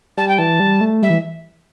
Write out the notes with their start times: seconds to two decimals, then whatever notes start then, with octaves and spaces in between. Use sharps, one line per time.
0.17 G3 A5
0.28 G5
0.38 E3 A5
0.60 G3
0.81 A3
1.02 G3 E5
1.10 E3